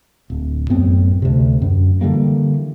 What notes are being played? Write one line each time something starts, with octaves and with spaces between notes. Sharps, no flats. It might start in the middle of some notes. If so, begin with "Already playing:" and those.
D1
A1 F#2 B3 C4
D2 C3
F#2
D3 E3 G3 A#3